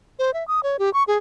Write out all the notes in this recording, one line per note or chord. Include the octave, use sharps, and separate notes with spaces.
C5
E5
D#6
C#5
G4
C#6
G#4